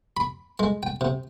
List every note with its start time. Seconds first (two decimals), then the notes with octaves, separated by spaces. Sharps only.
0.17 B5
0.59 G#3
0.83 G5
1.01 C3